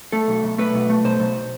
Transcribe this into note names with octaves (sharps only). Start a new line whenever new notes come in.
A3 A4
B1
B1
A3 B4
B1
A3
B1 C5
B1